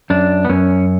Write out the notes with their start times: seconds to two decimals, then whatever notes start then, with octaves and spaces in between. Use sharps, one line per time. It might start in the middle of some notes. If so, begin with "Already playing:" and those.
0.10 F#2 D4
0.45 B3
0.49 F#2 C#4